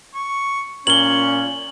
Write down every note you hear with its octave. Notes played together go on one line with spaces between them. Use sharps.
C#6
A#2 C#4 C#5 F#7 G7